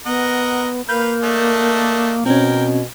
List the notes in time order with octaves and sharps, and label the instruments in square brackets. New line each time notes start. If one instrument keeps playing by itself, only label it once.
[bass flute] B3 [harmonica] A#4 D#5 F#5
[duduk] A#3 [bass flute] A#4 [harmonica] B4 F5 [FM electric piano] G6
[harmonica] A3 D4 D#5
[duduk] B2 [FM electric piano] C4 C#4 [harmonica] A#4 G5